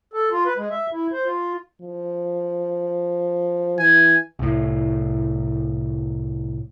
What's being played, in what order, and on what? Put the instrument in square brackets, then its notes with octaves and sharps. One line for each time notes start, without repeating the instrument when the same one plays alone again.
[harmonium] A4
F4
B4
G#3
E5
E4
C5
F4
[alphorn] F3
[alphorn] E3 [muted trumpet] G#5
[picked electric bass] C2 A2